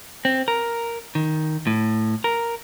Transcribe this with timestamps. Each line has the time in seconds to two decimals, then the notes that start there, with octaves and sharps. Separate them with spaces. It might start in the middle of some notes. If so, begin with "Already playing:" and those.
0.25 C4
0.48 A#4
1.15 D#3
1.67 A2
2.24 A#4